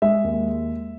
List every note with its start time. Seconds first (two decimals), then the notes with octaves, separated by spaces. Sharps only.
0.02 G#3 E5
0.24 D#2